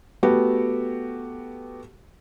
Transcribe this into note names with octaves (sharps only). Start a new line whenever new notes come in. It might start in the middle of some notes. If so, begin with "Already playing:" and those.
A3 B3 F#4 G4